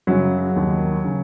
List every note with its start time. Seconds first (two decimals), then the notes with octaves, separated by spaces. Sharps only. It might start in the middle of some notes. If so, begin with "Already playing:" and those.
0.07 F#2 C#3 F#3
0.56 D#2 D#3
1.05 C#3